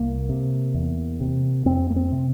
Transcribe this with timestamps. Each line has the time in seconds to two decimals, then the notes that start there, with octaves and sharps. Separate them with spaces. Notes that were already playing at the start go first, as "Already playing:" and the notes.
Already playing: C2 A#3
0.29 C3
0.74 E2
1.20 C3
1.65 F2 C4
1.90 A#3
1.96 C4
2.12 C3